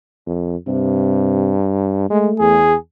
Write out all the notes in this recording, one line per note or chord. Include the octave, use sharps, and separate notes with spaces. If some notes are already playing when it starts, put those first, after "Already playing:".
F2
G2 C3
G#3 A3
E2 G#4